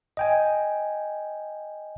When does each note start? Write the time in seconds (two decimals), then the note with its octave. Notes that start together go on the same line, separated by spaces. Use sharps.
0.17 D#5 G5 G#5